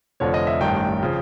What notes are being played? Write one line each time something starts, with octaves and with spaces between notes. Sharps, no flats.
F1 F2 D3 F3 C#5
D#5
E5
A1 G2 D#3 G5
C#3 F3